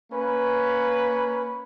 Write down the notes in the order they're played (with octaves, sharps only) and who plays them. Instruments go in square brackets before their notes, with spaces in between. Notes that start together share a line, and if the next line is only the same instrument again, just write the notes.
[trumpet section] A#3 C#4 B4